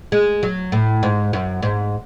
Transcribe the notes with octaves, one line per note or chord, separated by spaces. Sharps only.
G#3
F#3
A2
G#2
F#2
G#2